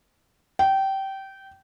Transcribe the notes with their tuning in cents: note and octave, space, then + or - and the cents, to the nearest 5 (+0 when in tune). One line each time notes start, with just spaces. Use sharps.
G5 -20